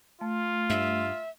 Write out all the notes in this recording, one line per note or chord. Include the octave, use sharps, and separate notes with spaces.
A3 F4
G2 E5